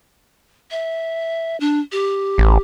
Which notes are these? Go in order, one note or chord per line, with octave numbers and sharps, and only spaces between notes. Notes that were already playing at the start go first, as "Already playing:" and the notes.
E5
D4
G4
A1